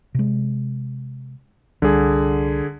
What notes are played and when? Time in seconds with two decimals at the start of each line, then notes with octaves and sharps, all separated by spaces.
0.15 C3 G#3
1.82 C2 D3 G3 G#4